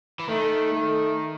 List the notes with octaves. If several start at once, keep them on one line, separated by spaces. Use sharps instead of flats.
E3
D#3 A3
A3